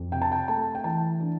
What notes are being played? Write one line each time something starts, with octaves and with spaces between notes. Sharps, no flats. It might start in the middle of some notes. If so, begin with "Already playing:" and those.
Already playing: F2
C3 G5
A5
G5
A3 A5
G5
E3 A5
D4